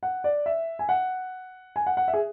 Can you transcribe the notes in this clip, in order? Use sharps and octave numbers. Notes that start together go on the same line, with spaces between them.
F#5
D5
E5
G#5
F#5
G#5
F#5
F#5
E5
G#4